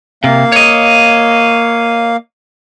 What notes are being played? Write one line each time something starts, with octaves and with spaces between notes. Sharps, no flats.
C3 A#3 F5
C#5 D#5